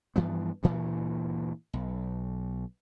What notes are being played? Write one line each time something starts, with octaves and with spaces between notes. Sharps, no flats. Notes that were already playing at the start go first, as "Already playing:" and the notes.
G2 E3 F3 B3
D2 G2 A#2 E3
B1